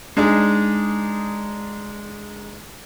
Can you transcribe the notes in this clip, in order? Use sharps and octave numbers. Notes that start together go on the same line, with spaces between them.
G#3 D4 D#4 G#4